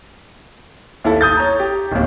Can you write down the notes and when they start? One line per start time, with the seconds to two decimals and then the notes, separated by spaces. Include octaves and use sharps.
1.04 D#2 E4 A4
1.21 D#6 G6 A6
1.37 C#5 A#5
1.60 G4
1.91 D1 D#2